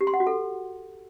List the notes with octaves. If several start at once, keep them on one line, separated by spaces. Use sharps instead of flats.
G4
C6
F#5
F#4
A4